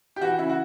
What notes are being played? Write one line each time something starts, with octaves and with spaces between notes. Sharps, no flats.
G4
E3 F#4
C#3 E4
F#4